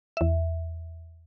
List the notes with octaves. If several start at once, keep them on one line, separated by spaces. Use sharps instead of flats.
E2 E5